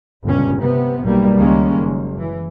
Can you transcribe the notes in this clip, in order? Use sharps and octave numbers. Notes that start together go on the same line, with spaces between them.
G1 C#2 G2 A#2 C#4
C3 B3
B1 G3 A#3
C#2 D#3 G3 G#3 A#3 C#4
F#1
E3